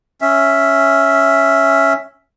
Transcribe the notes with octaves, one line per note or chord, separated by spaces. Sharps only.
C#4 E5